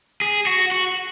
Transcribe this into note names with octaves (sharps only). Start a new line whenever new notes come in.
G#4
F#4
F#4